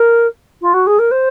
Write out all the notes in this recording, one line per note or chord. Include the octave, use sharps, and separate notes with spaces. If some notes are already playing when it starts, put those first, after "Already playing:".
Already playing: A#4
F4
F#4
G#4
A#4
C5